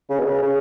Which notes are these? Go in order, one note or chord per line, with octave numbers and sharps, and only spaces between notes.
C#3
B2
C#3
C#3